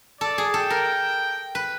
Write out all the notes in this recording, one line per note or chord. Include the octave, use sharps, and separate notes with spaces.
A4 D5
G#4
A4 G5
A#4
B4